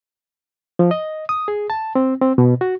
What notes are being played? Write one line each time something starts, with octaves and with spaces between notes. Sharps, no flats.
F3
D#5
D#6
G#4
A5
C4
C4
B2
F#4